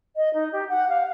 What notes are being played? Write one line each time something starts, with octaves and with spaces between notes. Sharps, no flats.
D#5
D#4
G4
F#5
F5